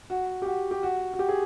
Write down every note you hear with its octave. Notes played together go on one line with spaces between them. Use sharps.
F#4
G4
F#4
G4
F#4
F#4
G4
G#4